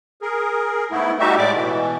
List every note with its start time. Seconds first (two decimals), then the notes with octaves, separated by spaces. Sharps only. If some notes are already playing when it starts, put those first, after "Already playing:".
0.22 G#4 A#4
0.91 G#2 A3 B3 E4
1.19 G3 A3 D#4 F#4 G4 E5
1.38 A2 G#3 D5 D6
1.54 B2 E3